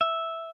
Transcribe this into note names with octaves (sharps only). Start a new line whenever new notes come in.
E5